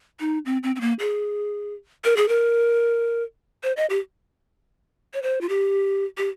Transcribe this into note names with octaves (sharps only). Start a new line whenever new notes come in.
D#4
C4
C4
C4
A#3
G#4
A#4
G#4
A#4
C5
D#5
G4
C#5
C5
F4
G4
G4